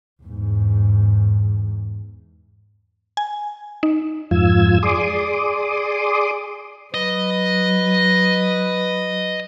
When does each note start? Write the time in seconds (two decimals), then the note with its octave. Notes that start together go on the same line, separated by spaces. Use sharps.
0.23 E2 G#2
3.17 G#5
3.83 D#4
4.31 F2 G#2 F3 F4 E6 G#6
4.83 G#4 D5 C6 D6 D#6
6.94 F#3 B4 D#5